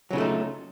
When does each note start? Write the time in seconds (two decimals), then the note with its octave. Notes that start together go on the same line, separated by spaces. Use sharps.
0.11 F#3
0.13 C#3
0.16 F4
0.18 A3
0.21 D#4